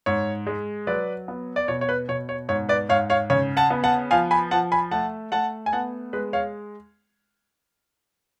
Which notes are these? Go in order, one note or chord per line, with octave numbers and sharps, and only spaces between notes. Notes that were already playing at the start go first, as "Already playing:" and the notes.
G#2 C#5
G#3
F#3 B4 D5
B3
D5
B2 C#5
C#5
B4
B2 C#5
C#5
G#2 C#5
B4 D5
G#2 C#5 F5
C#5 F5
C#3 C#5
F#5 A5
B3
F#5 A5
F3 F5 G#5
G#5 B5
F3 F#5 A5
G#5 B5
A3 F#5 A5
A3 F#5 A5
G#5
B3 F#5 A5
G#3 B4
C#5 F5